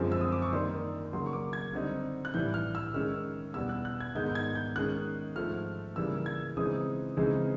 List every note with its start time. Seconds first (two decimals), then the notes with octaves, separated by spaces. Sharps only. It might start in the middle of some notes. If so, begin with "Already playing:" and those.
Already playing: F#2 D3 F3 G#3 C4
0.12 E6
0.21 D#6
0.32 D6
0.42 C#6
0.53 D#3 G3 A#3 D4 C6
1.13 C#3 F#3 A#3 C6
1.26 C#6
1.33 D6
1.53 G#6
1.73 D3 G3 C4 D#4
2.25 F#6
2.34 A2 E3 G3 G6
2.54 F6
2.75 E6
2.94 D#3 G#3 C#4 F6
3.54 E2 B2 G3 B3 E6
3.69 F#6
3.85 F#6
4.00 G#6
4.15 G#2 D#3 G#3 B3 D#4 G6
4.26 G6
4.35 G#6
4.55 G6
4.75 D#3 G#3 C#4 F#6
5.36 G#2 F3 A3 F6
5.96 C#3 E3 G3 A#3 E6
6.26 G#6
6.57 C#3 E3 G#3 C4 D#4 D#6
7.17 C#3 E3 G#3 C4 D#4